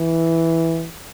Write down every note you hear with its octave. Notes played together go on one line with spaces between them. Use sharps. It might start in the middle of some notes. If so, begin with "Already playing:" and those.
Already playing: E3